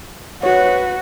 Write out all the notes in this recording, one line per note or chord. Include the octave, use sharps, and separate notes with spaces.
F#4 B4 C#5